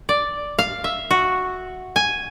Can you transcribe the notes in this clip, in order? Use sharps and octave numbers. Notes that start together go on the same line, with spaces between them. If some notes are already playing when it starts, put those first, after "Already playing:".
D5
F5
E5
F#4
G#5